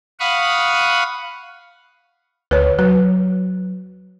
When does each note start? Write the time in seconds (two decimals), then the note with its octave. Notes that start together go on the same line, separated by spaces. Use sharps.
0.20 F5 F#5 B5 C#6 D#6
2.51 D2 B4 C#5
2.79 F#3 B4